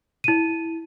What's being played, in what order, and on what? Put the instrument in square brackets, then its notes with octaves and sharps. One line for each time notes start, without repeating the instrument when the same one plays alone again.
[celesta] E4 D#7